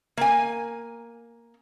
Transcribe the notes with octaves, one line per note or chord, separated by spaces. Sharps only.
A#3 G#5